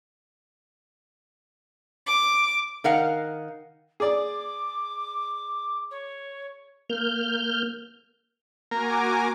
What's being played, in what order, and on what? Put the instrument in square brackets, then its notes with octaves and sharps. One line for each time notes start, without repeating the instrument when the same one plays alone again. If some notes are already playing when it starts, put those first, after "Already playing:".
[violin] D6
[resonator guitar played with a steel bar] D#3 A#4 F5 F#5
[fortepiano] G#4 D5 [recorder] D6
[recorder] C#5
[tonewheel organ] A#3 F6 G6
[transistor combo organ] A#3 A#4 [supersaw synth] F#4 G#5 D6